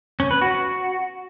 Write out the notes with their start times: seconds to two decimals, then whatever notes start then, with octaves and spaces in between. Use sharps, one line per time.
0.20 C#4
0.31 B4
0.42 F#4